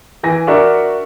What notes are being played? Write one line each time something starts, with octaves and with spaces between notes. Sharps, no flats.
E3 G#5 A#6
D4 F#4 A#4 E5 A#5 C#6